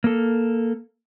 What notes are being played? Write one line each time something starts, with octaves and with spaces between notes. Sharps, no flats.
A#3 A4